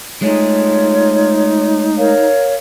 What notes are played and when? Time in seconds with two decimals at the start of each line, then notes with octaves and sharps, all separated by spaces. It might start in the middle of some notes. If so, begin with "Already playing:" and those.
0.22 G#3 A3 D#4 F4 G#4 C#5
1.97 A#4 C#5 F5